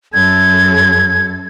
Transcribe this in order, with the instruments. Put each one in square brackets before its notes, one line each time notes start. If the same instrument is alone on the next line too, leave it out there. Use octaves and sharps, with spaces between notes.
[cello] F#2 A4 [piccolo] G#6